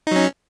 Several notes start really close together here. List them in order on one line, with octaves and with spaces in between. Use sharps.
D#4 F#3 C#4